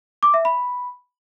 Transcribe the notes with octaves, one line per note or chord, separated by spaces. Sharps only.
D6
E5
B5